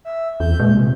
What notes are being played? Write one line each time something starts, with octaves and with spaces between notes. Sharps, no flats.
E5
E2 G6
A#2 G#3
C3